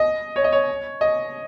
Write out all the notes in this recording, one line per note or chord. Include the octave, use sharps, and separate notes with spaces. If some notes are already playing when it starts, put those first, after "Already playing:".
Already playing: D#5
C#5
D#5
C#5
D#5